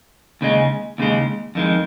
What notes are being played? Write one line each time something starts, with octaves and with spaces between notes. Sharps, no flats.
D#2 C#3 G#3
D#2 C#3 G#3
F2 D#3 G#3